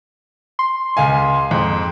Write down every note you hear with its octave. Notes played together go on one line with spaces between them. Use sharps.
C6
C#2 F5 G#5
F2 G#2